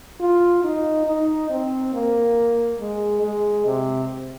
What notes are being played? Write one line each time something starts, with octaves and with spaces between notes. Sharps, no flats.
F4
D#4
D#4
C4
A#3
G#3
G#3
C3